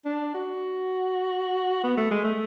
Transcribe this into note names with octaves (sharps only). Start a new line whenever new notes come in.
D4
F#4
B3
A3
G#3
A3